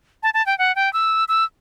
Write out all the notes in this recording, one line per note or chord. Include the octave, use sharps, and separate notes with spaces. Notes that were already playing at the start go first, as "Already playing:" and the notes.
A5
A5
G5
F#5
G5
E6
E6